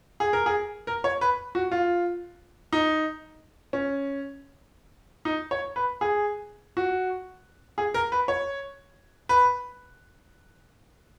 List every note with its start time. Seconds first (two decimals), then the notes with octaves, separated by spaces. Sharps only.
0.20 G#4
0.33 A#4
0.46 G#4
0.87 A#4
1.04 C#5
1.21 B4
1.55 F#4
1.72 F4
2.73 D#4
3.73 C#4
5.25 D#4
5.51 C#5
5.76 B4
6.01 G#4
6.77 F#4
7.78 G#4
7.94 A#4
8.12 B4
8.28 C#5
9.29 B4